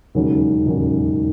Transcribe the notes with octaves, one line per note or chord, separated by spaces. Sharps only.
E1 D#2 C#3 F#3 C#4
E1 D#2 C#3 F#3 C#4